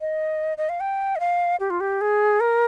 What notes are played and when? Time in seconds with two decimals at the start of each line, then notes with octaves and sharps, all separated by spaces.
0.01 D#5
0.58 D#5
0.69 F5
0.80 G5
1.16 D#5
1.20 F5
1.60 G4
1.70 F4
1.80 G4
2.01 G#4
2.40 A#4